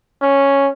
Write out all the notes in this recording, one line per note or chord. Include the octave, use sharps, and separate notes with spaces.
C#4